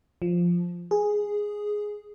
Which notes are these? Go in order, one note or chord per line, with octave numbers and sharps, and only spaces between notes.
F3
G#4